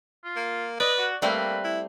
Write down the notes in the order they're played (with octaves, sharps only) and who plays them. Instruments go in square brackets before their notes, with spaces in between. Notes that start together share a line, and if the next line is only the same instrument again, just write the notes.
[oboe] F4
[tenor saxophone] A#3
[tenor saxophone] B4 [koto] D5 [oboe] D#5
[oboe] F#4
[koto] G3 A3 C4 [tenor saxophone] A#3 [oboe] B4
[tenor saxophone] E4